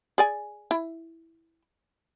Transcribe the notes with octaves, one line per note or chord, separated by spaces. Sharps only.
G#4 D5 G#5
E4